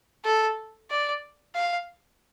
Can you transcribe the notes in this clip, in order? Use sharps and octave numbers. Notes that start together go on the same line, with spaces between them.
A4
D5
F5